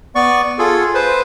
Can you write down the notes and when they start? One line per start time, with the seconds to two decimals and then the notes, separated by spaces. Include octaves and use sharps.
0.15 B3 D5 C#6
0.59 F4 G#4 A4
0.94 B4 C5